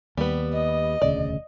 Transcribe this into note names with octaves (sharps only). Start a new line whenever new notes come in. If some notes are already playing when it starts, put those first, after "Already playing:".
D#2 G3 B3
D#5
E1 D2 C#3 D5